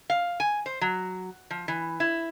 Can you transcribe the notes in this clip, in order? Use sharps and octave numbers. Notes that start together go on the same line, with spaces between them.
F5
G#5
C5
F#3
F3
E3
E4